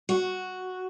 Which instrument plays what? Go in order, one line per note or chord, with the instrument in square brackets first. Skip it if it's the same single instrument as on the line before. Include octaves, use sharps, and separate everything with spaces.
[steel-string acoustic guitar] F#4